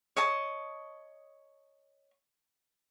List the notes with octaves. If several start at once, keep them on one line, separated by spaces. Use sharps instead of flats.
C#5 D#5 A5 D#6